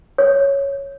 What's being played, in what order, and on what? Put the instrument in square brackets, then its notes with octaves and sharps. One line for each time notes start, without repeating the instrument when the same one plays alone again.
[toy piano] C#5